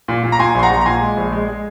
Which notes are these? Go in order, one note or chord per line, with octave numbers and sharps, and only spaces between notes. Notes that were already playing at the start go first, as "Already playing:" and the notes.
A#2
A#2
A#5
A#2 G#5 C6
A#1 C6
F#5 A#5
A#1
A#5
A#2 G#5 C6
G#3
A#1
G#3
G#3